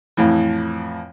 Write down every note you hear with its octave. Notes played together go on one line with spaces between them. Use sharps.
F2 A2 E3